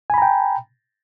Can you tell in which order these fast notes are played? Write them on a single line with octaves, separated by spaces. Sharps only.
G#5 B5 A#5 G5